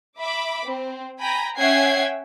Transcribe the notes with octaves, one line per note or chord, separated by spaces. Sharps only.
E5 B5 D6
C4
G5 G#5 A#5 B5
C#4 E5 F#5 G5 G#6 C7